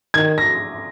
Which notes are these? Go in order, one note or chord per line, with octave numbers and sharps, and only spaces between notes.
D#3 G#6
A#6